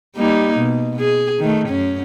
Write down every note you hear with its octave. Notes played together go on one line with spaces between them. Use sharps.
G3 A#3 D#4
B2
G#4
D#3 A3
F#2 C#4